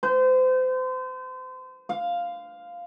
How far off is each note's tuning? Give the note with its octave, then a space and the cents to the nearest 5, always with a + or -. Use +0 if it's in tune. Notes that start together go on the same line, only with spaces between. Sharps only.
C5 -35
F5 +0